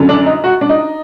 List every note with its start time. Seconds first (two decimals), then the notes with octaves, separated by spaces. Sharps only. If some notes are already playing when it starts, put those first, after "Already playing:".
Already playing: F#2 D3
0.09 D4
0.26 D#4
0.44 F#4
0.61 D4
0.69 D#4